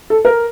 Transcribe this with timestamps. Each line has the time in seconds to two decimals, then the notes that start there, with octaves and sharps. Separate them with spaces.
0.10 A4
0.25 A#4